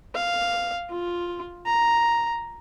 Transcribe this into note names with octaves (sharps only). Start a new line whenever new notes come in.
F5
F4
A#5